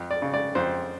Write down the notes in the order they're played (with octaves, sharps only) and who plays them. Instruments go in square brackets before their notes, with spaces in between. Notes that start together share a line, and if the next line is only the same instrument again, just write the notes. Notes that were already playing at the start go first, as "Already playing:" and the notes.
Already playing: [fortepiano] F2
D5
C#3
D5
F2 C5